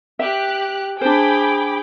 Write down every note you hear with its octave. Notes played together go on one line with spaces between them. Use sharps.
G4 E5 F#6
D4 G#4 C5 G5 B5 D6